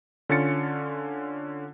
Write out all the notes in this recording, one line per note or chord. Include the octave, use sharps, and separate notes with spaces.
D3 C#4 F4 A6 C#7